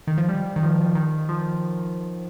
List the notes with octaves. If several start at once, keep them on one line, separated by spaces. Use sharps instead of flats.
D#3
F3
G3
D#3
F3
D#3
F3